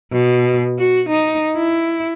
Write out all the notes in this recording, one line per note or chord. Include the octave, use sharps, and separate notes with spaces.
B2
F#4
D#4
E4